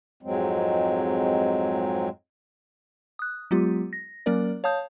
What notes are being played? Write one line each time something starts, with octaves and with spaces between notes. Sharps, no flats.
F2 G#2 F#3 G#3 C4
D#6 F#6
F#3 G#3 B3 F4 G4
A#6
F#3 A#3 C#4 A#4 D5
C#5 F5 A5 D#6 G6